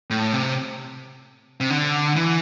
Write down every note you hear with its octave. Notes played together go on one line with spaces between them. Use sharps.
A2
C3
C3
D3
E3